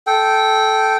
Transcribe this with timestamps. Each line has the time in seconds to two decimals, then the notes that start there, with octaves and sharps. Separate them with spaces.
0.07 A4 G5